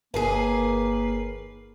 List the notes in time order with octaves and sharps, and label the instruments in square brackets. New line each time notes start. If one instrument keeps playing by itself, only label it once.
[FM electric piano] G1 A#4 C7 [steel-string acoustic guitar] D#2 G#4 [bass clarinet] A#3 [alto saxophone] B4